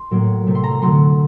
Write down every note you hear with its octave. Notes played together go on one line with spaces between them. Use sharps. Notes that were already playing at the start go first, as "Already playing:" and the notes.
Already playing: C6
A2 F#3 A#3
C3 F#3 A3
C6
A#5
D3 F#3 A3 C6